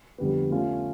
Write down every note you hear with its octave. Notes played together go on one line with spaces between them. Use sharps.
F2 D3 G3 B3
A3 C#4 F4